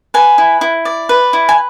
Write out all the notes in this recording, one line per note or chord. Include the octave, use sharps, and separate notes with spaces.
B4 G#5
E4
E4
D5
B4
E4
G#5